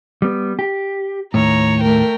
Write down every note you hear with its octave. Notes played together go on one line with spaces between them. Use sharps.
G3 B3
G4
D#2 A2 C#5 A#5
A3 A#4 G5